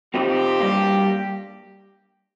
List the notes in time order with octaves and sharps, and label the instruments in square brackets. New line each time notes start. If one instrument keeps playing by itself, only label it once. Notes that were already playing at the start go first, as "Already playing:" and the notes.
[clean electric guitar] F2 C3 F3 C4 D#4 [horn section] G4
[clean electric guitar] G2 G3 A#3